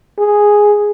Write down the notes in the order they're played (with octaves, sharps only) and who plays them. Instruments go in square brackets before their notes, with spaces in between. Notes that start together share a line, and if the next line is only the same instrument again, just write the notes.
[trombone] G#4